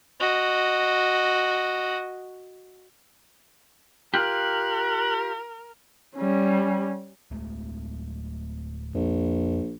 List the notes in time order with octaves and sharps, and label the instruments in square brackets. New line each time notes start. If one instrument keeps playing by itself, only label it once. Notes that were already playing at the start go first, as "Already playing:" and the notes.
[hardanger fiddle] F#4 D#5
[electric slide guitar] F4 G4 [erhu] A#4 [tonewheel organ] F#6
[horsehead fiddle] G3 C#4
[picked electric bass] D1 G#3 A3
[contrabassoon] A#1 [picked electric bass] F2